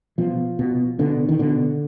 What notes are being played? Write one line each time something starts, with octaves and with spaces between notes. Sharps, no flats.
B2 F3
B2
B2 D3
D#3
B2 D3